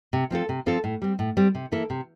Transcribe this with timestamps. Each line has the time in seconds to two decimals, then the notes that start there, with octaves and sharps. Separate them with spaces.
0.13 C3
0.31 F3 C4 F4 A4
0.49 C3
0.66 F3 C4 F4 A4
0.84 A2
1.02 G3 C4
1.19 A2
1.37 G3 C4
1.55 C3
1.72 E3 A#3 E4 A4
1.90 C3